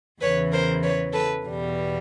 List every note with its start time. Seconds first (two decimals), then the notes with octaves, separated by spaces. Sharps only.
0.21 E2 C#3 E3 B4 C#5
0.52 A#4 C5
0.83 B4 C#5
1.13 A4 B4
1.44 E2 B2 G3